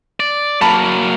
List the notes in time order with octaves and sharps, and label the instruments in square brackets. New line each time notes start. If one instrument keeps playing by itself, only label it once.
[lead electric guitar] D5
[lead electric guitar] F#3 A#3 [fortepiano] A5 B5